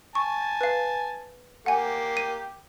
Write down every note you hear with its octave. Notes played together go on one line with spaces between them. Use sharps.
G#5 A5 C#6
B4 F5
A#3 G4 F#5 G#5
D#7